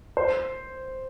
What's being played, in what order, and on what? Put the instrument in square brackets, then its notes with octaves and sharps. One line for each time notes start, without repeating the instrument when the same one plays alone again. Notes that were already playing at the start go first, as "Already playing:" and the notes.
[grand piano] C5